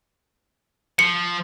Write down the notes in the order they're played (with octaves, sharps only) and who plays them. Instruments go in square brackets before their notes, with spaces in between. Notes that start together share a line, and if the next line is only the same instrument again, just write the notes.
[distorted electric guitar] F3 [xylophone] C#7